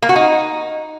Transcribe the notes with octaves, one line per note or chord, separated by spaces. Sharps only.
A#3
F#4
D#4